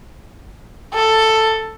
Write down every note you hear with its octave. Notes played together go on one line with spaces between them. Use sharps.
A4